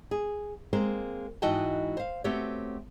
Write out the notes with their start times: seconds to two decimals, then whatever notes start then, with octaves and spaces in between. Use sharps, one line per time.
0.11 G#4
0.73 G#3 A#3 C4 A#4 C5
1.42 G#2 E3 F#4 D#5 G5 A5
1.97 C5 F5
2.24 A3 B3 C4 F#4 G4 C#5